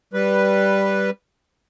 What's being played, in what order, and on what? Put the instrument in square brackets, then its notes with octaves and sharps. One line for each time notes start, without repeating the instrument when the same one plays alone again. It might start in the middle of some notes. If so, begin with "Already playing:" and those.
[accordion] G3 B4